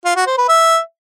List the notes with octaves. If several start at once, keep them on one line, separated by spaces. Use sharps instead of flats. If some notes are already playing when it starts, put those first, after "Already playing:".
F4
F#4
C5
B4
E5